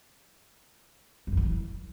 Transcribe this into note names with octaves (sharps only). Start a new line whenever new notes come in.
E2
F#2
C#3
E3